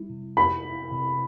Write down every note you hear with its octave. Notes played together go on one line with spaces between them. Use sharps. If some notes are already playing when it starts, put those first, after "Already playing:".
Already playing: G3 E4
C3
E4 B5
E4
C3